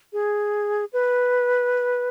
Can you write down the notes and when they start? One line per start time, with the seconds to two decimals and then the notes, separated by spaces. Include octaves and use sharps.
0.13 G#4
0.93 B4